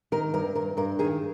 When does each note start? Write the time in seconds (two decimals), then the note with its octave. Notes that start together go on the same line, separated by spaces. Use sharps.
0.12 D#3 A#4
0.34 G2 A#4
0.55 G2 A#4
0.77 G2 A#4
0.99 D#3 G#4